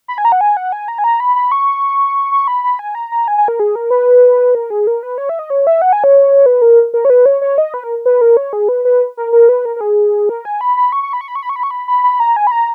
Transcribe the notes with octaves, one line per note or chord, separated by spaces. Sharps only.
B5
G#5
A#5
F#5
G#5
F#5
G#5
A#5
G#5
A#5
B5
B5
C#6
C#6
B5
B5
G#5
A#5
A#5
G#5
G#5
A#4
G#4
A#4
B4
A#4
G#4
A#4
B4
C#5
E5
D#5
C#5
E5
F#5
G#5
C#5
B4
A#4
A#4
C#5
B4
C#5
C#5
D#5
B4
A#4
B4
A#4
C#5
G#4
B4
B4
A#4
A#4
B4
A#4
A#4
G#4
A#4
G#5
B5
B5
C#6
C#6
B5
C#6
B5
C#6
B5
C#6
B5
C#6
B5
B5
B5
A#5
G#5
B5
A#5